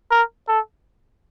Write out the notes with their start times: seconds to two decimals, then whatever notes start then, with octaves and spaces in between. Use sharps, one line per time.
0.11 A#4
0.48 A4